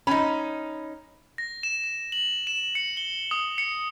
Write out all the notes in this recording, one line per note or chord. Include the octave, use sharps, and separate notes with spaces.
C#4 D#4 B5
A#6
E7
E7
F#7
E7
C#7
G7
D#6
C#7